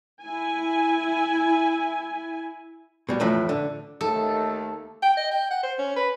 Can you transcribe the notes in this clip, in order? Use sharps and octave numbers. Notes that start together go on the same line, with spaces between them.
E4 G#5
B2 G3
F2 A2 E3
D3
D#2 A3 D#4 A4
G5
D#5
G5
F#5
C5
C#4
B4